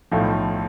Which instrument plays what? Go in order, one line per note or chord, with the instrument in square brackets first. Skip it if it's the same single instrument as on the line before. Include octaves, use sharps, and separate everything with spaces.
[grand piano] B1 A2 F3 A3